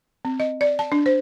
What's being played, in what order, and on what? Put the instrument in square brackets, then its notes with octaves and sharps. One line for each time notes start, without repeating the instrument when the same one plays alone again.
[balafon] C4
D#5
D5
A5
D4
C5